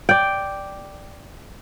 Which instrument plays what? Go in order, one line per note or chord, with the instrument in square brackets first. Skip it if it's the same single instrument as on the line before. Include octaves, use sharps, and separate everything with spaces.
[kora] D5 G5